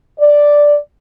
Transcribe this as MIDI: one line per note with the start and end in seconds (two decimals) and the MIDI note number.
0.19 0.76 74